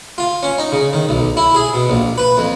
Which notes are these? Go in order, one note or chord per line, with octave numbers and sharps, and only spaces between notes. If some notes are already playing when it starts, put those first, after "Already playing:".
F4
C#4
D#4
C#3
D#3
B1
E4
G#4
B2
A#1
B4
F2